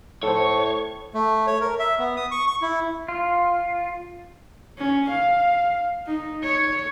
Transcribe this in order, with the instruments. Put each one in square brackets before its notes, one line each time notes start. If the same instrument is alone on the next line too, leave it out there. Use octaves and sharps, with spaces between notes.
[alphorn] A2 [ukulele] A4 C5 [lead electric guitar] C#5
[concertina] A3
C#5
A#4
E5
B3
D#6
C#6
C#6
E4
[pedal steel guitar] F4
[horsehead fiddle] C#4
F5
D#4
C#5